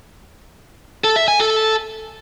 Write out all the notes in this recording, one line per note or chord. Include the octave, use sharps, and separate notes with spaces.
A4
E5
G#5
A4